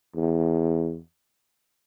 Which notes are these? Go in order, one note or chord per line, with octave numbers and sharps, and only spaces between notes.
E2